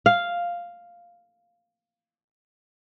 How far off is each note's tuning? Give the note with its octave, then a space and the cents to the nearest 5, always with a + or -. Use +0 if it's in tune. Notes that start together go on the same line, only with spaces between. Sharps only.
F5 +0